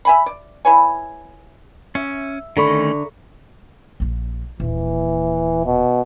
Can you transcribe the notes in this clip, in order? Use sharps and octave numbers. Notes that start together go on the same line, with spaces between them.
E5 G#5 B5
D5
E4 B4 C#5 G#5
C#4 E5
D3 D#3 A3 C#4 A#5 B5 C#6
A#1 F3
D#1 E3 A#3
B2